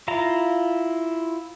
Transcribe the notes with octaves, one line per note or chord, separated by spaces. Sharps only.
E4 F4 A#5